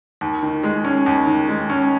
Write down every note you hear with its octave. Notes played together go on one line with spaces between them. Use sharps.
D#2
D#3
G#3
C#4
D#2
D#3
G#3
C#4